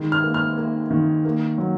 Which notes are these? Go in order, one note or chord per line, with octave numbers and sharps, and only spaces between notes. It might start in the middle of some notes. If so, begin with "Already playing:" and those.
Already playing: D#3 G#3
F6
A#3
F6
A#3
D#3
A#3
F#3